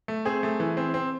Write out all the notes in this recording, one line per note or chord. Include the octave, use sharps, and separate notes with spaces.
A3
C4 G#4
A3
E3
C4
C4